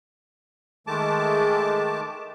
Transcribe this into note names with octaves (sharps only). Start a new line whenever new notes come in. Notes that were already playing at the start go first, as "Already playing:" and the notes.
D#3 G#3 A3 A5 D6